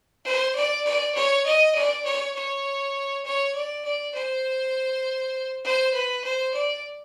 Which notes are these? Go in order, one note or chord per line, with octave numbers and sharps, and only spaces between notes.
C5
D5
D5
C#5
D#5
D5
C#5
C#5
C#5
D5
D5
C5
C5
B4
C5
D5